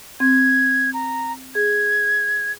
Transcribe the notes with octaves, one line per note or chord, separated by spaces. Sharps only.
C4 G#6
A#5
G#4 G#6